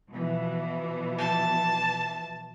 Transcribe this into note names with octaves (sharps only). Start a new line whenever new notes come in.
B2 E3 F3
A5